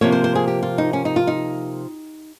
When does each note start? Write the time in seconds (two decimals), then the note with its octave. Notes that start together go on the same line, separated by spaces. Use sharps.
0.01 C3 F3 A#3 C#5
0.12 C5
0.24 C5
0.35 G#4
0.48 G4
0.63 F4
0.78 D#4
0.93 C#4
1.05 D#4
1.16 F4
1.27 D#4